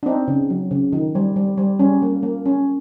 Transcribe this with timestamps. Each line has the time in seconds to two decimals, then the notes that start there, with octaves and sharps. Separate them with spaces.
0.03 D4
0.06 C4 D#4
0.28 C#3
0.50 F#3
0.71 C#3
0.93 D#3
1.15 G3
1.36 G3
1.58 G3
1.79 G3 C#4
2.02 A#3
2.23 A#3
2.46 C#4